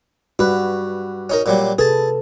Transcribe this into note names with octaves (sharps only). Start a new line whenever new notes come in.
G2 F#4 B4
C#4 D#4 A#4
A#2 F#3 G3
C3 G#4 A4 B4 A5